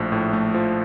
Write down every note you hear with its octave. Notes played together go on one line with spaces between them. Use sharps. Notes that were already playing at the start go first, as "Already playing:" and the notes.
Already playing: A#1 A2 F3 A3
A2
A3
F3